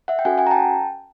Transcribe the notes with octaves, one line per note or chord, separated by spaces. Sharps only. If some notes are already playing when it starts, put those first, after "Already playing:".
E5 F#5
G5
C#4 F#4 A4 F#5 G#5
F#5 G#5
A#5
G5 A5